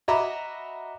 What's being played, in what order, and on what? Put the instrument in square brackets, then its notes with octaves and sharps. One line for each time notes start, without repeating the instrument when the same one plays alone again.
[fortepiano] F#4 D#5 E5 A#5 B5 D6